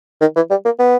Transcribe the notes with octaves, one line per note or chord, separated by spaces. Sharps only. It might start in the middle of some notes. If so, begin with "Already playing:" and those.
D#3
E3
G3
A#3
B3